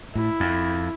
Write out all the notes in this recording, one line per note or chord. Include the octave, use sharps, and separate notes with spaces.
A2 E4
F2